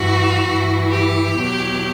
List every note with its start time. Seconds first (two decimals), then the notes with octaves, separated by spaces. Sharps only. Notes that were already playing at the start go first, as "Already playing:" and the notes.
Already playing: G2 E3 F#4
0.47 G2 E3
0.91 G4
1.35 E2 B2 F#3